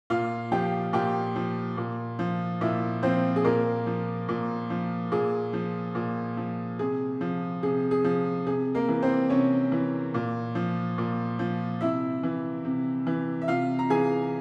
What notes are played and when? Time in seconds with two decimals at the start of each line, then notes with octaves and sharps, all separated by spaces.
0.10 A#2 F4 F5
0.52 F3 G4 G5
0.93 A#2 G4 G5
1.36 F3
1.78 A#2
2.19 F3
2.61 A#2 E4 E5
3.03 F3 C4 C5
3.36 G#4
3.44 A#2 A#3 A#4
3.86 F3
4.29 A#2
4.70 F3
5.12 A#2 G#4
5.53 F3
5.95 A#2
6.37 F3
6.79 C3 G#4
7.21 F3
7.63 C3 G#4
7.91 G#4
8.04 F3
8.47 C3 G#4
8.75 A#3 A#4
8.88 E3
9.02 C4 C5
9.29 C3 C#4 C#5
9.72 E3
10.14 A#2
10.55 F3
10.98 A#2
11.39 F3
11.81 C3 E4 E5
12.23 E3
12.65 C3
13.07 E3
13.42 E5
13.48 C3 F4 F5
13.79 A#5
13.90 E3 G#4 G#5